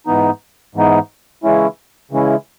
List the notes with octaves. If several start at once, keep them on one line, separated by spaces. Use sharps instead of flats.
G#2 E3 B3 D#4
G#2 E3 B3 D#4
C#3 E3 G#3 C#4 E4
C#3 E3 G#3 C#4 E4